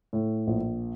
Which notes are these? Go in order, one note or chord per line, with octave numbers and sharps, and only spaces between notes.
A2
A#1